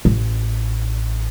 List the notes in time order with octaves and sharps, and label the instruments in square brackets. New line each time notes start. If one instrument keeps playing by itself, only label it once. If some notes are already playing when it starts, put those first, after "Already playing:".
[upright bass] A1